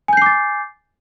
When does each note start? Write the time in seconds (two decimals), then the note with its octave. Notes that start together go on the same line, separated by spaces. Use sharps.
0.08 G#5
0.13 G6
0.17 C7
0.22 D6
0.26 A6